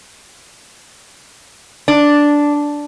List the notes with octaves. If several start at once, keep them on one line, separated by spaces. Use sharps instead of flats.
D4